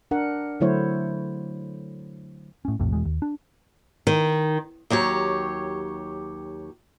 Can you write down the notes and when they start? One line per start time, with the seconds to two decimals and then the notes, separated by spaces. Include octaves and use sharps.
0.11 D4 A#4 F#5
0.60 D3 F#3 A3 E4 C5 C#5
2.65 A2 C#4
2.80 B1 F2 A2 C3
2.93 E1 E2 G#3
3.05 D#2
3.22 D4
4.07 D#3
4.90 D#2 F#3 G4 C#5